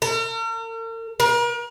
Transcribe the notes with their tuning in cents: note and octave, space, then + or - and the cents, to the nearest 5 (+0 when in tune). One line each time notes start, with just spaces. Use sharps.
A#4 -45
A#4 +40